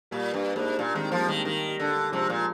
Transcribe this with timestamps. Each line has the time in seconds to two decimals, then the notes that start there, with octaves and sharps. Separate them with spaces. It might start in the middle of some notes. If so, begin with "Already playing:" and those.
0.11 A#2 G3 A#3
0.34 G2 G3
0.56 G#2 A#3 D4
0.79 A#2 A#3 D4
0.95 D#3 G#3 C4
1.12 F3 G3 A#3
1.28 D#3 G#3 C4
1.45 D#3 G3 A#3
1.68 G3
1.79 D3
1.90 G3
2.12 C3 F3 G#3
2.30 A#2